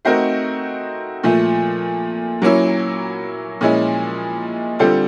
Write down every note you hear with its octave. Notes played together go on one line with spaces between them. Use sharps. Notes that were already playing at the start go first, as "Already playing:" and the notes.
A3 C4 D#4 F#4 A#4
A#2 F3 A3
F#3 A#3 C#4 E4
A#2 F3 G#3 C#4 E4
D3 G3 C4 F4 A4